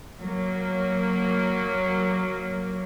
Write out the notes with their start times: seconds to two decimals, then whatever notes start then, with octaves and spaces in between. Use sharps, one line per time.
0.19 F#3 A#3